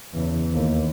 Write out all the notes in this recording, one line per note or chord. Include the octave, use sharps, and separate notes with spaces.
E2 C#3
D#2